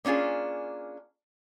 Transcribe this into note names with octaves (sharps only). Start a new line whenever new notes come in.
A#3 C#4 D4 F4 G#4